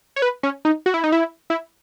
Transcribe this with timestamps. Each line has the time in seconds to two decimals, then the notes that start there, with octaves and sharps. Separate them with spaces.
0.16 C#5
0.22 B4
0.43 C#4
0.65 D#4
0.86 F#4
0.94 E4
1.04 D#4
1.12 E4
1.50 E4